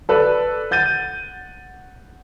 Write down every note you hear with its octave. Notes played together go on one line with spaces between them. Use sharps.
A4 B4 D5
F#5 G6 A6 D#7